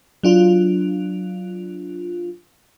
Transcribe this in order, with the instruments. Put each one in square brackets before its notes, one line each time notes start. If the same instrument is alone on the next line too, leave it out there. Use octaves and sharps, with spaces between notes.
[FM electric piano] F#3 D4 F4